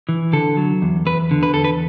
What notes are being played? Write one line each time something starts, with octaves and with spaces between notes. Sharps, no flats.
E3
D3 A4
F#3
E2
E2 B4
D3
B4
E2 A4
B4